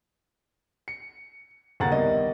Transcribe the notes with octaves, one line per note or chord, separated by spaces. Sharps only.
C#7
D#2 C#3 F#5 A#5 A6
C2 D#3 B3 D#5